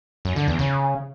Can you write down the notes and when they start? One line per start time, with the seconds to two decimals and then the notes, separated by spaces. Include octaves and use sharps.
0.25 F#2
0.36 D3
0.48 E2
0.59 C#3